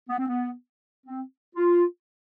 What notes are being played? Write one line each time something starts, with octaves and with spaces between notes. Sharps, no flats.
B3
C4
B3
C4
F4